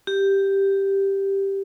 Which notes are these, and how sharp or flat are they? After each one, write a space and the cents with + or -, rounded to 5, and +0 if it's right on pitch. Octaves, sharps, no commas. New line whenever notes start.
G4 +0